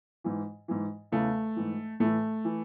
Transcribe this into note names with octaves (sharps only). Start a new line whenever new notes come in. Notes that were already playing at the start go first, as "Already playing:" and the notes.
G#2 E3
G#2 E3
E2 C#3 E3 A3
G#2 E3
A2 E3 A3
E3